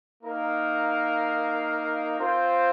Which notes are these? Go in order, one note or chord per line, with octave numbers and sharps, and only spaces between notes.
A#3 D#4 A#4 F5
C4 F4 C5